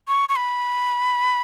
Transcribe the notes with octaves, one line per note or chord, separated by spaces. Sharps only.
C#6
C#6
B5